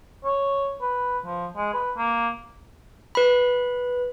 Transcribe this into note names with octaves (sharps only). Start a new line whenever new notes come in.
C#5
B4
F3
G#3
B4
A#3
B4 B5